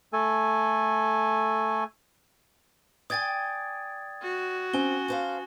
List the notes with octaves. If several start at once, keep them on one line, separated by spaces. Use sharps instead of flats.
A3 A4 G#5
D5 G5 G#5 D#6 G#6 A6
F#4
C4 C#4 G#5 G7
A4 C5 F5